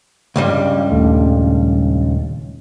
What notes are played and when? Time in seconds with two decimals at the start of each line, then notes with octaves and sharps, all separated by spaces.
0.36 C#2 G2 G3
0.91 D#1 A3